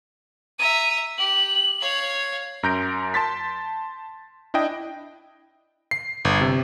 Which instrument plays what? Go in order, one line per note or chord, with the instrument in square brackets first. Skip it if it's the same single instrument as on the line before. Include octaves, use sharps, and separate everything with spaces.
[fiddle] E5 A#5 [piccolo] D#7
[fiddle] G4 [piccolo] F#7
[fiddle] C#5 F5
[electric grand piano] F#2 A#5 G6 A#6 D7
A5 C6 A6 B6
D4 E4 D#5 G5
C7
G1
C3